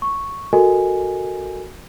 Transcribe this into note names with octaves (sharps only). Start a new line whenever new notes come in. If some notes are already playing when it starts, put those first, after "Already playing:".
C#6
F#4 A4 A#4 D#5 G#5